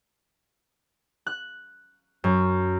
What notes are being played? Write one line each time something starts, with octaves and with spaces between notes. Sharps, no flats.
F#6
F#2